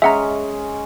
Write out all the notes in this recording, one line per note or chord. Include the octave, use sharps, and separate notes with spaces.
G#3 C#4 E5 F#5 A#5